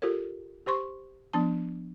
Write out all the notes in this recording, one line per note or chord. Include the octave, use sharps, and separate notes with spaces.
F4 G4 A4 A#4 C#5
G4 C5 C6 C#6
F3 B3 D4 A5